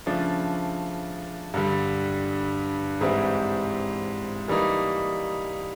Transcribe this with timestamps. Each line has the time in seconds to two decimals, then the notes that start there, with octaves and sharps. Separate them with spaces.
0.06 C#3 F3 A3 D4
1.54 G2 D3 G3
3.01 G#2 E3 G3 C4 E4
4.48 E3 G3 A#3 D#4